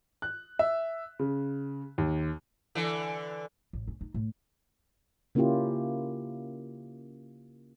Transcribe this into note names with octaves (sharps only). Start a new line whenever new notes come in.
F#6
E5
C#3
D#2
D3 E3
A1
C#4
D#4
A2
C#3 A#3 C#4 E4 F4 G4